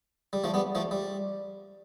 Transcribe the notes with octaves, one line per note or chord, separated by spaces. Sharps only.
G3
F3 A3
G3 B3
F3 A3
G3